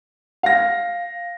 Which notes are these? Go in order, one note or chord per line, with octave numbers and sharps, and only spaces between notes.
F5 A#6